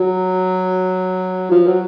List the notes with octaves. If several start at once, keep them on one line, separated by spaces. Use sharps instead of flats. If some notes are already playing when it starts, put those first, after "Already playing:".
Already playing: F#3
F3
F#3